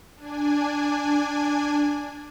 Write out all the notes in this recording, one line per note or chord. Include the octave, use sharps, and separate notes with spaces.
D4 G#5